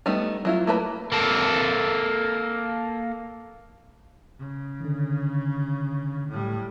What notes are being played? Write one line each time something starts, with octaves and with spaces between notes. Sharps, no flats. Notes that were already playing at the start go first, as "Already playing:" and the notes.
G3 A3 B3 D#4
F#3 E4 F4
A3 A#3 B4 A#5 B5
A#3 A4
C#3
D3 D#3
A2 G3